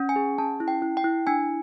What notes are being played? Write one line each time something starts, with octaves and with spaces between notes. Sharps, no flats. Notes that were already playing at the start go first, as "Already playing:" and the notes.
Already playing: C#4
G#5
G#4
C#4 A5
E4
G5
E4
G5
E4
D4 G#5